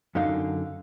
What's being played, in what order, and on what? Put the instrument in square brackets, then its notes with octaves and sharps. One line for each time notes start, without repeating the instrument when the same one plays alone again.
[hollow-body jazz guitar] F#2 D3 D#4 F5